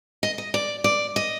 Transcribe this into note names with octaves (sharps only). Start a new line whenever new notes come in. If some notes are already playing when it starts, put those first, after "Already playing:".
D#5
D#5
D5
D5
D#5